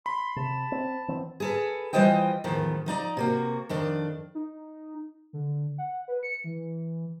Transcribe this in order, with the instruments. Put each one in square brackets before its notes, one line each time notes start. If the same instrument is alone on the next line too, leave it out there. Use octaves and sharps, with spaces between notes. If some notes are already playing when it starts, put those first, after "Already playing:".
[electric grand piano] B5 [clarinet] C6
[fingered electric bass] C3 [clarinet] A5
[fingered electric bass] C4
E3 B3 C4
[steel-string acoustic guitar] G#4 A4 B4
E3 G3 F4 C5 D#5 G5
E2 A2 D#3 F3
F3 D#4 D5 A#5
C3 A#3 F#4
F2 D#3 D4
[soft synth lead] D#4
D3
F#5
B4
C#7
E3